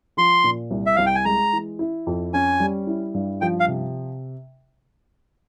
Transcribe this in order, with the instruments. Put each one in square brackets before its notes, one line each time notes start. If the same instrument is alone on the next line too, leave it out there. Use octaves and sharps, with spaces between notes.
[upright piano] F3 [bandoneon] C6
[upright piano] A#2
C2
[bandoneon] E5
[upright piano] C2 [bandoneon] F5
[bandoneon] G5
G#5
[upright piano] G#3 [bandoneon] A#5
[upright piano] E3
E4
F2
[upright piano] C#4 [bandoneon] G#5
[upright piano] G3
E4
G2
[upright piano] F3 [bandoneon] G5
[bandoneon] F5
[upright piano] C3